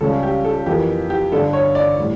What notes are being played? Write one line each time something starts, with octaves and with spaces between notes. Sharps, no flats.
C#2 C#3 G3 C#4 A4
G4
A4
F2 E3 A#3 G4
G4
G1 G2 D3 A4
C#5
D5
A2 G3